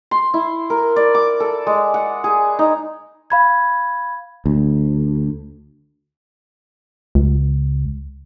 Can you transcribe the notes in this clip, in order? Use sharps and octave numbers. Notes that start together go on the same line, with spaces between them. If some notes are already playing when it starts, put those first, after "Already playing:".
C6
E4
A#4
D5
D6
A4
G#3
F#5
G#4
D#4
F5 B5 G#6
D2
C#2